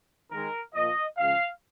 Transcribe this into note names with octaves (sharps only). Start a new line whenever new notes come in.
D#3 G#3 A#4
A#2 F3 A#3 D#5
C#3 F3 G#3 F5